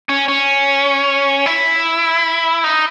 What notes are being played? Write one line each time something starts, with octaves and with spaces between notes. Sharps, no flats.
C#4
C#4
E4
D#4